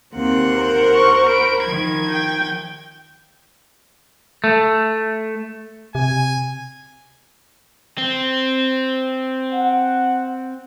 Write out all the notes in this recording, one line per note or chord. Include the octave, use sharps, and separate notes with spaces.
D#2 A#3 C4 F#5
A#4 C5
C#6
B5 D7
D#3 F3 G#6
G5
A3
C3 G#5
C4
F#5